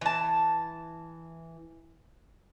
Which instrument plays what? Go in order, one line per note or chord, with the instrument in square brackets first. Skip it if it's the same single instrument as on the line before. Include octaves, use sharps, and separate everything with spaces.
[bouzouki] E3 A5